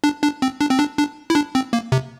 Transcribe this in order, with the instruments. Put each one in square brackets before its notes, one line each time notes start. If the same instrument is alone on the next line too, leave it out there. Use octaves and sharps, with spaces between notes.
[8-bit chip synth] D4
D4
C4
D4
C4
D4
D4
E4
D4
C4
A#3
C3